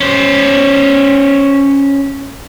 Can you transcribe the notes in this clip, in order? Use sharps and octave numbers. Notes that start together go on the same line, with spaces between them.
C#4 C5